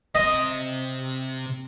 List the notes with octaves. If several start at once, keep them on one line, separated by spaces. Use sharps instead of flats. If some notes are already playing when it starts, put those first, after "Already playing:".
C3 D#5 C6